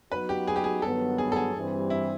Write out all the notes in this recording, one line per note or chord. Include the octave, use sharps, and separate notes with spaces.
F#3 B3 D#4 F#4 B4
G4
G#4
G4
G#4
G2 D#3 F#3 B3 A4
G#4
A4
G#4
G2 E3 G3 C4
E4